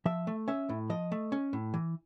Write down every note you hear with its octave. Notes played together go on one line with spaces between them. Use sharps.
F3 E5
A3
C#4 E5
A2
F3 D#5
A3
C#4
A2
E3